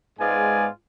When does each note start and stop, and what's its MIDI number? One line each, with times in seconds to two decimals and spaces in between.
0.19 0.67 44
0.19 0.67 56
0.19 0.67 59
0.19 0.67 65
0.19 0.67 74
0.19 0.67 80